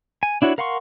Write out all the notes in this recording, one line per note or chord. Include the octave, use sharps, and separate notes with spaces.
G#5
D4 E4 F#4 C#5
A#4 F5 F#5 C6 C#6